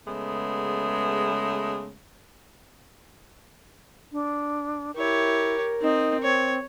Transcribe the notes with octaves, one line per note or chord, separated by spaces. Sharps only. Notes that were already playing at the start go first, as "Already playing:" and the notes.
C#3 G#3 A3 B3
D4
E4 G4 A#4 C#5
C4 D#4
C4 C#5